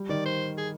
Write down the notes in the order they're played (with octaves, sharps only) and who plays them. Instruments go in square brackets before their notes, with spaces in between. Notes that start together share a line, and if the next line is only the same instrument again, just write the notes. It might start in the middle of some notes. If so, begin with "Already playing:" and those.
Already playing: [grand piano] G3
[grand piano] D#3 [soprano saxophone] D5
[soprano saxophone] C5
G#4